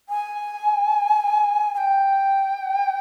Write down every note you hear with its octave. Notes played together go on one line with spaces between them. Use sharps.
G#5
G#5
G5